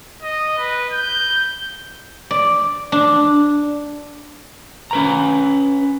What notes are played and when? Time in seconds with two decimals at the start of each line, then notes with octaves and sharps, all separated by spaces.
0.22 D#5
0.58 B4
0.92 G6
2.31 D5
2.92 D4
4.91 C#4 B4 A#5